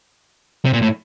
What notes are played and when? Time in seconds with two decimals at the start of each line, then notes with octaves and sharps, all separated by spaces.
0.65 C3
0.73 A#2
0.82 A2